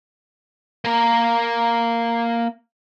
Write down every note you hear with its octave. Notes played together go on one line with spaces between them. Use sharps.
A#3 A#4